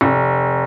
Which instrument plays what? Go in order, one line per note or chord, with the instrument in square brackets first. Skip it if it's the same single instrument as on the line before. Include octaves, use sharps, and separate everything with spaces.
[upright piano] F1